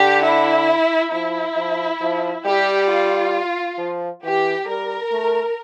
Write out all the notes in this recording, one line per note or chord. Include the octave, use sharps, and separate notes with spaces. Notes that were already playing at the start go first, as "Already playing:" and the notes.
Already playing: D3 G4
E4
F3 E4
F3
F3
G3 G4
F4
F3
E3 G4
G3 A#4
A3